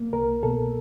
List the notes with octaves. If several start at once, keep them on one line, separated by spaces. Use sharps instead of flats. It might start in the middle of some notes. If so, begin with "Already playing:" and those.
Already playing: A#3
C2 A#4
B2 A4